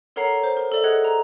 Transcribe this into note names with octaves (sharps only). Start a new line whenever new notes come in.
A4 A#4 C#5 F#5 A#5 C7
C5
A#4
A4 D5 E5
G#4 D#5 F#5 F#6 G#6 C#7
A#5